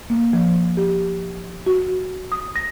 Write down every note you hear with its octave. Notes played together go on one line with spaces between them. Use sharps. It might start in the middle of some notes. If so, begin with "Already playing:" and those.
A#3
F3
G4
F#4
D#6
A#6